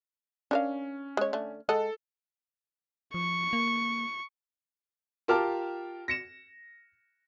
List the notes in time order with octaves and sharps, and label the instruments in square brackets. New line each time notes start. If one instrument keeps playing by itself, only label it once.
[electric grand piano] C#4 [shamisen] D4 A#4 F5
[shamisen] G#3 C#5
D3 A3
[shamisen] G#3 D#5 F#5 [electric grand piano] A4
[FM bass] F3 [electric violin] C#6
[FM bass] A#3
[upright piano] F4 G4 A#4 A5 D6 F6
A#6 C#7 E7